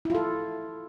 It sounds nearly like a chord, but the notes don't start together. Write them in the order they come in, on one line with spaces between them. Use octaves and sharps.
E4 F4 A4